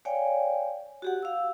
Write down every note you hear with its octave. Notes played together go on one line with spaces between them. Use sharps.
C#5 D5 F5 G5 G#5
F#4 G4 F#5
F5 E6